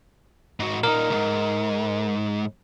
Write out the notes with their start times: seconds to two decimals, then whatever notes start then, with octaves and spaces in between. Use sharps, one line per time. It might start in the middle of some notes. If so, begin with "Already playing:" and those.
0.60 G#2 F#4
0.83 A#2 D#4 A#4
1.10 C2 G#2